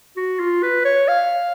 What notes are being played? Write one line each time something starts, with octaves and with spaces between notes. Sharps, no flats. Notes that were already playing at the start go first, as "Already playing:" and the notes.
F#4
F4
B4
C#5
F5